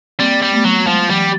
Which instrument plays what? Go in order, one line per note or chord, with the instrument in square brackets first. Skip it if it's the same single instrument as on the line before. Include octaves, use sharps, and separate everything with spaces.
[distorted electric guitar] G3 [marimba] A#3 C4
[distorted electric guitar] G3
[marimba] A3 B3
[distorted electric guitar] F#3
[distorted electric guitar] F3 [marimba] F#3 G#3
[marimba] E3 F#3 [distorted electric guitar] G3